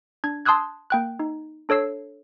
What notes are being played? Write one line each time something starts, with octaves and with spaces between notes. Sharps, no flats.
D4 G#6
A5 C6 D#6 E6 F#6 G#6
A#3 G5 F#6
D#4
D4 A4 C#5 E6 C7